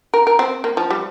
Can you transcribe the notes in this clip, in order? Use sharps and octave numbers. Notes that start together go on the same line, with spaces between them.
A#4
A#4
C4
A#3
F3
G3